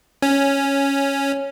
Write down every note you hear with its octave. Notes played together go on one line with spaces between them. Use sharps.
C#4